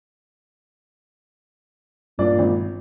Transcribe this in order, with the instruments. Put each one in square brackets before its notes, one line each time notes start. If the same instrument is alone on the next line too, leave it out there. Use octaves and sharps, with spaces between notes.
[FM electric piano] G2 [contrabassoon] A#2 [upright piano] D4 D5
[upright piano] G#1